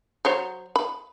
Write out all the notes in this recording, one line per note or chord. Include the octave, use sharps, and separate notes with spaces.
F#3 C5 C#5
B5